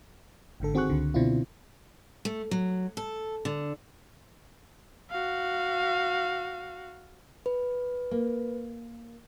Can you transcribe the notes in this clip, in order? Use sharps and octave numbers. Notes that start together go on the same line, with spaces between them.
G#1 G#2 D3 A4
D#3 C4 F#4 G#4 C#6 F#6
C#2 D3
B2 D3 C4 D4 E4 F4
A3
F#3
A4
D3
F#4 F5
B4
A#3